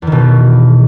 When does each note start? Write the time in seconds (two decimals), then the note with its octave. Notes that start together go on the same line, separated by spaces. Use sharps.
0.02 E2
0.07 D#3
0.12 B2